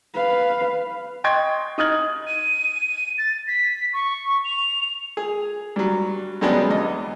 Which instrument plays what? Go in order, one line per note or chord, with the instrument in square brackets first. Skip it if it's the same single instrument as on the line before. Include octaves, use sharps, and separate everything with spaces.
[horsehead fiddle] B4 F5
[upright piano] D#5 G5 C6 C#6 G#6
D#4 D#6 F6 G#6 F#7
[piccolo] D#7
A6
B6
C#6
F7
[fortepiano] G#4
G2 F#3
F#2 G3 G#3 B3 C#4 D4
E2 D#5